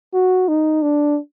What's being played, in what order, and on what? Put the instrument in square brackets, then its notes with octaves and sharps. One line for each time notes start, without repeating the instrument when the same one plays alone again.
[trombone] F#4
D#4
D4